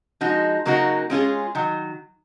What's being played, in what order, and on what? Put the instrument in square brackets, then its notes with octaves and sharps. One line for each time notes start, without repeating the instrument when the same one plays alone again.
[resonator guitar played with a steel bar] F3 G#3 D#4 F#4
C#3 F#3 A#3 D#4 F#4
G#3 C#4 F4 G#4
D#3 F#3